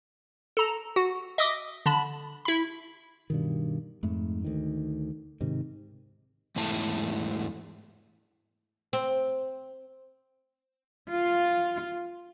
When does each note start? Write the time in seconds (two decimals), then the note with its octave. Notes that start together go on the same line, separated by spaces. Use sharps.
0.57 A4 A#5
0.96 F#4
1.38 D#5 E5 D6 D#6
1.86 D3 A5 B5
2.45 E4 B5
3.30 G2 B2 D#3
4.03 F2 G#2 A3
4.45 D2 D#3
5.41 G#2 C3 D#3
6.56 E2 G#2 A3 E4 A5
8.93 C4
11.11 F4